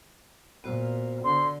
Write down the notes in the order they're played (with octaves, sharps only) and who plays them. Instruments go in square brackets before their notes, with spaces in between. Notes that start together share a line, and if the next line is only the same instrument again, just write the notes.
[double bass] A#2 [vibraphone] B3 F#4 C5
[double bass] D3 [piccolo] C6